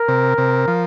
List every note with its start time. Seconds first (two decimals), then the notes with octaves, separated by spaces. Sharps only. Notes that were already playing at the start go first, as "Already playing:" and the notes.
Already playing: A#4
0.08 C3
0.38 C3
0.68 F3